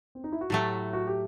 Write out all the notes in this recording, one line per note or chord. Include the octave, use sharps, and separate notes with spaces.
C4
D#4
E4
F#4
A2 F#3 A3 E4 G4
F#4
G4